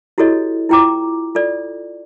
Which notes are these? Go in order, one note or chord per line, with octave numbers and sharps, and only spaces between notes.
E4 F#4 G4 A4 C#5 D#5
E4 F4 G5 A#5 D6
F4 A4 D5